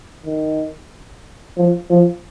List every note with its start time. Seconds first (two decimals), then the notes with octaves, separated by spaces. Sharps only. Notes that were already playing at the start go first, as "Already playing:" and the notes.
0.25 D#3
1.57 F3
1.90 F3